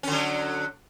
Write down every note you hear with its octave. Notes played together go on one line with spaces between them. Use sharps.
D3 F#3 C#4